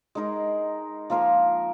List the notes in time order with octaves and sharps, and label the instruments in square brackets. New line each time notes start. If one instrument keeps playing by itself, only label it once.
[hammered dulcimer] G#3 D#4 A#4
F3 A#3 F4 A#4